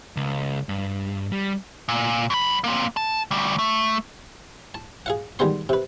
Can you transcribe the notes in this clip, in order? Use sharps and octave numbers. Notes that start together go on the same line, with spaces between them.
C#2
G2
G3
A#2
F#2 B5
A#3 C4
A5
D2 G3
A3
A5
G#4 F5 F#5
D#3 G3 G#3 B3 C6
C3 B4